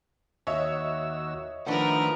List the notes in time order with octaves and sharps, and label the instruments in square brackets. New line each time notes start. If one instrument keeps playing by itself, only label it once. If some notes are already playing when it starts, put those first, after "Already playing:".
[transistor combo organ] D#2 F#4 E6 [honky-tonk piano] C#5 D#5 E5
[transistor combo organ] D#3 F3 A3 [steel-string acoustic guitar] D4 F#5 [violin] A#4 B4